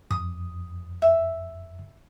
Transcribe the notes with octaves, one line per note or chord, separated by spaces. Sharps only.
F2 D#6
E5